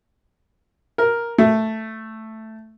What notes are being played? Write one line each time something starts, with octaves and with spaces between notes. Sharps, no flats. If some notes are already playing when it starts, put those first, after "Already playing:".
A#4
A3